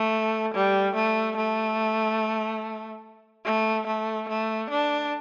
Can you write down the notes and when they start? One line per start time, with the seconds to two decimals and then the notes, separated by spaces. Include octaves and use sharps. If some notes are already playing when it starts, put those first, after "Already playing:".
Already playing: A3
0.54 G3
0.95 A3
1.37 A3
3.45 A3
3.87 A3
4.29 A3
4.70 D4